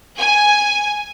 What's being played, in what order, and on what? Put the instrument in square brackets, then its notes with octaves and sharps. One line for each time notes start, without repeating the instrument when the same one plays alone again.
[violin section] G#5